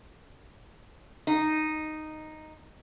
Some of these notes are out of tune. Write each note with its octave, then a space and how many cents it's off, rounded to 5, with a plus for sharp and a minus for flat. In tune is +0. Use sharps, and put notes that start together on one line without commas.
D#4 -5